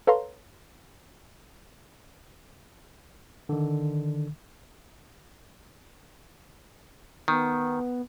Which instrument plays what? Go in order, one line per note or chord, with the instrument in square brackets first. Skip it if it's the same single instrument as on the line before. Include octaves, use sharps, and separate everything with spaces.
[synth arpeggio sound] A4 B4 C#5 F5 A#5 C6
[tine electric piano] D3 D#3
[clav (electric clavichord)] D#3 [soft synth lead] B3